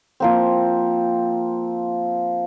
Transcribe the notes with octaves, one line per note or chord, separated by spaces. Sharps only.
F3 A#3 C4